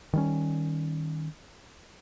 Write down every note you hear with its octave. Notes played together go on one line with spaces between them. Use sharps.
D#3 G3 C#4